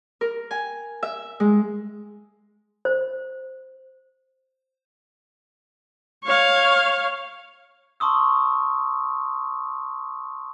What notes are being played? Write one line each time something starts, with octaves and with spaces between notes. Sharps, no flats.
A#4
G#5
E5
G#3
C5
C#5 F5
A5 C6 C#6 D#6 E6